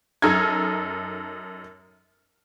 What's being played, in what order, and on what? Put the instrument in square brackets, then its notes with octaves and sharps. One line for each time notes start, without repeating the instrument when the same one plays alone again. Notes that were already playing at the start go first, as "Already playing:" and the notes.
[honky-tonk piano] F#2 D#4 A4 A#5 F6 G#6